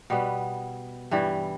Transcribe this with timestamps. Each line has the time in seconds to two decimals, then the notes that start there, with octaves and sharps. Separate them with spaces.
0.10 B2 G3 B3
1.11 G2 E3 G3